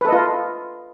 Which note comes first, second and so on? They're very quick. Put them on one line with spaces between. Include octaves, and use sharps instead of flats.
B4 A4 D#5 F4